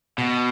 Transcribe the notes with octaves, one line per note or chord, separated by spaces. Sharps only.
B2